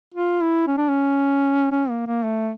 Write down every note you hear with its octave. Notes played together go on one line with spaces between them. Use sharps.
F4
E4
C#4
D4
C#4
C#4
A#3
A#3
A3